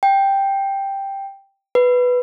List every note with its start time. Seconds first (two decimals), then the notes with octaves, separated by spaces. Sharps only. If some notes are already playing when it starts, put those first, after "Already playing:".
0.03 G5
1.75 B4